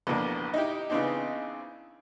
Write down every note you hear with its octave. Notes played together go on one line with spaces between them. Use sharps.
A1 F2 B2 D3 A#3 D4
D#4 E4 G4
C#3 E3 B3 C4 D4 D#4